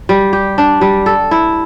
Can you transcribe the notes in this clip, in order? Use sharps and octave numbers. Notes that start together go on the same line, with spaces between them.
G3
G4
D4
G3
A4
E4